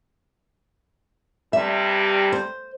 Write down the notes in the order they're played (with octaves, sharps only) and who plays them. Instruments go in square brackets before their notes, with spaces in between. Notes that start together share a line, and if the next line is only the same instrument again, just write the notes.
[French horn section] G2 C3 G3 [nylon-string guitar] E5
[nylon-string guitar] C5